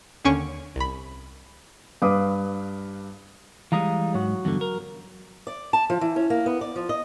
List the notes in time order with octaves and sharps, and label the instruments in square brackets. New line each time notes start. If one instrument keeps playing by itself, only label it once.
[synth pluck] D#2 D3 C#4 C#6 D7
C2 B5
[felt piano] G2 B4 F5 D6 D#6
[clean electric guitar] E3 G3 G#3 [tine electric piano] F5 A#5 D#6
[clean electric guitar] G#2 [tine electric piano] F#3 F#4
[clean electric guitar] E2 G2 D3
A#4
[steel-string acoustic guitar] D5
A5
F3
E3
C#4
A#3
B3
D5
F3
D#5